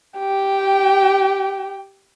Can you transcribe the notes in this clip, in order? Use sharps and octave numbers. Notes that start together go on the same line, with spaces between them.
G4 G5